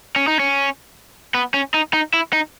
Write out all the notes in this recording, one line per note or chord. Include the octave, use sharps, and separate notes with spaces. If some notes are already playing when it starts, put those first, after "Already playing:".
C#4
D#4
C#4
B3
C#4
D#4
D#4
E4
D#4